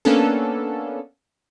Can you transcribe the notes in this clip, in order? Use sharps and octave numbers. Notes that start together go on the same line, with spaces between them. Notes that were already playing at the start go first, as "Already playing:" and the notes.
A#3 B3 C#4 D4 A4